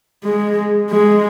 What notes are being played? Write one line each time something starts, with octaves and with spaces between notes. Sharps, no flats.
G#3
G#3